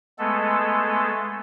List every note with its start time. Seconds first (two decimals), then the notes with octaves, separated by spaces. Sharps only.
0.19 G#3 A3 B3 A4